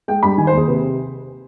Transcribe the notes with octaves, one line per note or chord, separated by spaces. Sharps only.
G#3 G5
G2 B5
D#3 G#5
C5
D#2 G#4
C3 B4